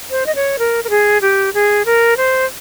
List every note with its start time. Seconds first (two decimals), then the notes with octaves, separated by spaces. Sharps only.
0.11 C5
0.26 D#5
0.35 C#5
0.59 A#4
0.84 A#4
0.90 G#4
1.21 G4
1.54 G#4
1.86 A#4
2.17 C5